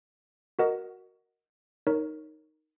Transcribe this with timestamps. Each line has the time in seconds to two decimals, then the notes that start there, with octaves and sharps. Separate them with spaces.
0.59 F#4 A#4 D#5 F#5
1.87 D#4 A#4 C#5